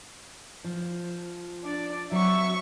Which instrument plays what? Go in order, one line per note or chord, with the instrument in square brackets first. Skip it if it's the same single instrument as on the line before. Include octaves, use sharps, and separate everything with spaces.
[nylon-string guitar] F3
[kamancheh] D4 D5
[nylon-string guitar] F#3 C4 [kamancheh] E5 C#6